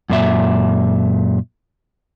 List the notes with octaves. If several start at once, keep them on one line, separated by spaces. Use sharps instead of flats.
F#2 A#2 E5